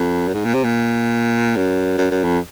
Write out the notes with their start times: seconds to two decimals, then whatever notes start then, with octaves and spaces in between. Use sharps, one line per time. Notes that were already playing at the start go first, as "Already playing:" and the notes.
Already playing: F2
0.28 F#2
0.34 G#2
0.45 A#2
0.54 C3
0.64 A#2
1.56 F#2
1.98 F#2
2.11 F#2
2.24 F2